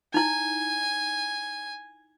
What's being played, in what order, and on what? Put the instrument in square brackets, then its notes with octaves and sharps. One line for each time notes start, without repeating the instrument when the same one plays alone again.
[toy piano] D#4 E4 [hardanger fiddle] G#5